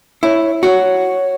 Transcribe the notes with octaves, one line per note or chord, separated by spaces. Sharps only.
E4 C#5
F#4 C#5